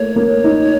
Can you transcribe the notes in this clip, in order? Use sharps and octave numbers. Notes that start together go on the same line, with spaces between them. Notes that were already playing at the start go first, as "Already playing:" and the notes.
Already playing: A3 A#3 C#5
A#3
D#4